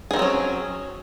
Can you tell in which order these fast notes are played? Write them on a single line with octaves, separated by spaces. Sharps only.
G#4 D#3 C4 F#3 C#4